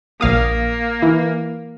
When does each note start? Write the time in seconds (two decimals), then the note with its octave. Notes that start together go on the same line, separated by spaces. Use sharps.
0.21 A#1 A#3 F5 D#6
1.02 E3